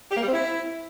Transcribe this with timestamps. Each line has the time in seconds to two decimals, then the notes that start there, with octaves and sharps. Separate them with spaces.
0.11 G4
0.17 A#3
0.22 G3
0.28 C4
0.33 E4